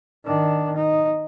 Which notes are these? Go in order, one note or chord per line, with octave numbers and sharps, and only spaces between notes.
D#3 D4
D#4